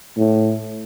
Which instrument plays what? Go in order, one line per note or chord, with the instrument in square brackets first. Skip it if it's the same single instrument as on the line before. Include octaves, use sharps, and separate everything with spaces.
[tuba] A2